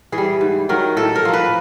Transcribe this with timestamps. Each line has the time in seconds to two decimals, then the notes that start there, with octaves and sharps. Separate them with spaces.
0.12 E3 G#4
0.18 G3
0.41 G#2
0.69 D#3 F#3 A#4
0.97 A2 A4
1.15 A#4
1.25 F3 A#3
1.34 B4